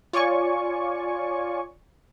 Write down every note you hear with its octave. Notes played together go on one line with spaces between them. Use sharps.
F4 C#5 D5 G#5 C#6